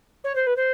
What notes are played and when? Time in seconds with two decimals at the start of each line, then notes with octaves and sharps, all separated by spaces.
0.24 C#5
0.35 C5
0.46 B4
0.56 C5